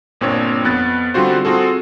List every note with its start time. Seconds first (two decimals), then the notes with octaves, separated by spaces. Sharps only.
0.21 G1 A#2 C4 D4 C#5
0.64 F2 B3 F#6 A6
1.14 D3 G3 C4 F4 F#4 C5
1.45 C4 F4 F#4 G#4 A4